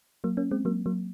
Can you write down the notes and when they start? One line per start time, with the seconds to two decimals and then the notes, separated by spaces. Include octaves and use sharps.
0.24 F#3 A#3
0.37 A#3 C#4
0.51 G#3 C4
0.65 F#3 A#3
0.86 F#3 A#3